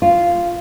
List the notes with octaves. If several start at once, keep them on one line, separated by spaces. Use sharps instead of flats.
F4